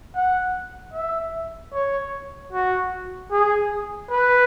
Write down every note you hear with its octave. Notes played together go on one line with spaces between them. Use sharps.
F#5
E5
C#5
F#4
G#4
B4